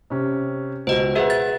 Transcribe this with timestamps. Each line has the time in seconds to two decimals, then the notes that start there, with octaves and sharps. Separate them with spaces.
0.10 C3 C#4
0.87 C#2 B2 C5 D#5
1.15 F#4 G#4 B4 E5 F#5
1.30 A6